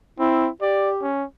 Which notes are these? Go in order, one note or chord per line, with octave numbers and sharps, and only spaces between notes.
C4 E4
G4 D5
C#4